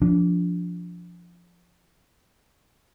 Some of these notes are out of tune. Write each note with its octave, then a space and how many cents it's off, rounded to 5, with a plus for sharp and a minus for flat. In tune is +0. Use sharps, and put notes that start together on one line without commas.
F3 +0 D4 -25